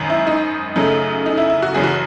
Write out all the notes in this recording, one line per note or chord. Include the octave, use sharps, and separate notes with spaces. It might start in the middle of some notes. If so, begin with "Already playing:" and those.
Already playing: G#1 F#2 D#3
E4
D#4
F#2 C#3 F#3 A3
D#4
E4
E4
F#4
F#1 F#2 E3 G#4
F#4